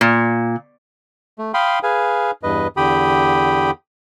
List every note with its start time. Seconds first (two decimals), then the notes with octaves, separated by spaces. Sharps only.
0.01 A#2
1.39 A3
1.54 F5 G5 B5 C6 D#6
1.83 G#4 B4 F5 G#5
2.43 E2 G2 B4 D#5
2.77 E2 D3 G4 G5 B5 D#6